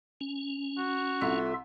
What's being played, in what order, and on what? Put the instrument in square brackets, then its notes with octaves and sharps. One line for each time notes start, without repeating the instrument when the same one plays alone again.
[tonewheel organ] C#4
[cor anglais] F#4
[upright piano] C2 [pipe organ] F4 A4 E5